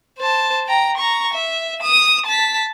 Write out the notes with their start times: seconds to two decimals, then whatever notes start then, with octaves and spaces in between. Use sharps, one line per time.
0.19 C5 A5
0.67 G5 A#5
0.97 A#5 C#6
1.33 E5
1.80 D#6 E7
2.26 A5 B6